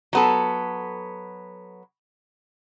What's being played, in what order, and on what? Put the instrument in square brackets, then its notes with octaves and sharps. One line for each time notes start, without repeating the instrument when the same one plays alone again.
[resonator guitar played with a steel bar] F#3 B3 A4